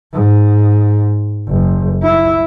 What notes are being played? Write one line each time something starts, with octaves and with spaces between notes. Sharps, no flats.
G#2
F#1
E4